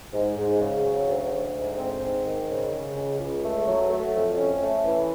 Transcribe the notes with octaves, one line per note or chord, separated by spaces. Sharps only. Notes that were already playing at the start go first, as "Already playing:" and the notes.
G#2
G#2
C#3
F#3
D2
D2
G#2
C4
G#2
D#3
C#3
C#3
C#2
C#2
A3
F#3
A3
F2
C#4
A3
E3